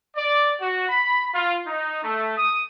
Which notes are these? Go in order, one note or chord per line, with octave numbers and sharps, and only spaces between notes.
D5
F#4
B5
F4
D#4
A3
D#6